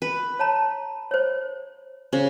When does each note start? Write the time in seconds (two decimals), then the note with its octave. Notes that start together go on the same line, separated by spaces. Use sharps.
0.02 B4
0.39 C#5 A5 A#5
1.11 C5 C#5
2.13 C#3 C5